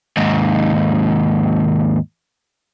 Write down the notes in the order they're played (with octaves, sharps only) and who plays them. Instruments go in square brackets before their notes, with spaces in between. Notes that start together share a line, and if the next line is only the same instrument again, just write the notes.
[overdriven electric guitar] D#2 G#2